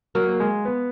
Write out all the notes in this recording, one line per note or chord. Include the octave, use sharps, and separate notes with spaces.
F#3 A#3
G#3
B3